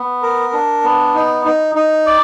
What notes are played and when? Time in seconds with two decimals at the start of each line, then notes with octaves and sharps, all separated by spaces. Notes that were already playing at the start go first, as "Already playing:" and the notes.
Already playing: B3
0.22 A#4
0.53 D4
0.84 B3
1.15 D#4
1.45 D#4
1.75 D#4
2.06 D5